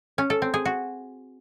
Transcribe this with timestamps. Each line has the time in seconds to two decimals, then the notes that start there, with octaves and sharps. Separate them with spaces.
0.18 C#4
0.30 A4
0.42 C4
0.54 G#4
0.65 F#4